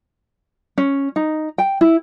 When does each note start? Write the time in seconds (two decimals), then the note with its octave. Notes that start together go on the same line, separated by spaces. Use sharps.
0.78 C#4
1.16 D#4
1.58 G5
1.81 E4